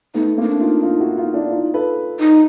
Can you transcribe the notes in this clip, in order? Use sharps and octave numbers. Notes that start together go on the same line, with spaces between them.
A3 B3 D#4
A#3 C4 D#4
D4
D#4 F4
D#4 F4
E4 F#4
D#4 F4
D4 E4
D#4 F4
A4 B4
D#4